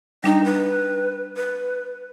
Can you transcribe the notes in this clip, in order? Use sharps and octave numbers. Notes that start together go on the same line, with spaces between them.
G3 D4 D#4 G5
B4
B4